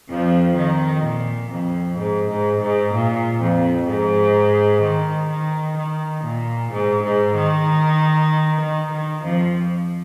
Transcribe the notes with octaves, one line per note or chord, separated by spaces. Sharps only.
F2 F3
D#3
A#2
F2
G#2
G#2
G#2
A#2
F2
G#2
D#3
D#3
D#3
A#2
G#2
G#2
D#3
D#3
D#3
F2 F3